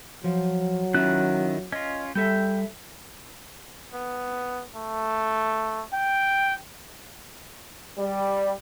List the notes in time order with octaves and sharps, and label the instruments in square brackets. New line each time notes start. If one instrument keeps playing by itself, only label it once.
[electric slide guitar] F3 [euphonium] F#3
[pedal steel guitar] D#3 F#6 [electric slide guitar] C#4 E4 F4
[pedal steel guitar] C#4 F4 [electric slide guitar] D#5
[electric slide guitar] G3 A4 E5 [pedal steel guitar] G5
[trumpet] B3
A3
G5
[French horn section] G3